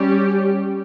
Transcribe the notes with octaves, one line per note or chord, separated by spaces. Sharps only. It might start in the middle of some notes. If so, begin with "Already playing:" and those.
Already playing: G3 C#4 G4